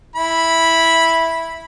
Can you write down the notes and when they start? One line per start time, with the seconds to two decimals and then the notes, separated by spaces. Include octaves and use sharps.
0.16 E4 B5